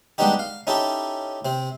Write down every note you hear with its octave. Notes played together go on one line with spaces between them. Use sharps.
G3 G#3 B3 D4 D#4 G4
F5
C#4 D#4 E4 G4 A4
C3 C4